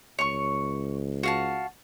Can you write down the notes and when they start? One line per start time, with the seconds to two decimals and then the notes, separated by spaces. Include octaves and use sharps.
0.19 C#2 C#5 C#6
1.23 F#4 F5 A5